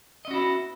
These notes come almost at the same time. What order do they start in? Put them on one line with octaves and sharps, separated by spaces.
D#5 C#4 F#4 E4 B3